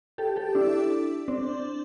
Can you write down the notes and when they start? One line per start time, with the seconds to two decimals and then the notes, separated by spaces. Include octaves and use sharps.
0.18 G4 A4
0.36 G4 A4
0.55 D4 E4
1.28 C4 D4